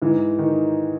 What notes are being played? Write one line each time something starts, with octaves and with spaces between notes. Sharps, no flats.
G#2 E3
D#3